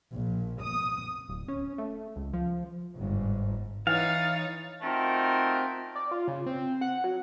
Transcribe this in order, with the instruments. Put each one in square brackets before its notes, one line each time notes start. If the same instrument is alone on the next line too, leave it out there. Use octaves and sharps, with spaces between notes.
[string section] A#1
D#6
[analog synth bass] D1
C#4
A3
C#2
F3
[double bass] G1 G#2
[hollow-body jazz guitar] E3 [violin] D#4 C#5 [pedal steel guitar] F5 [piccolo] A6
[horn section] A3 C4 D#4 F4 F#4 A#4
[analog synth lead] D5
F4
C#3
C4
F#5
F#3